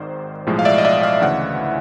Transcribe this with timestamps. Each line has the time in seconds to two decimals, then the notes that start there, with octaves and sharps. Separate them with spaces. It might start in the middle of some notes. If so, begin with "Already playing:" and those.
Already playing: G#1 G#2 D#3 C5 D5
0.47 B1 A2 F3 G#3
0.59 F5
0.65 D5 E5
0.78 D#5
0.85 D5 E5
1.03 D#5 F5
1.21 D2 C#3 E3 E5 F#5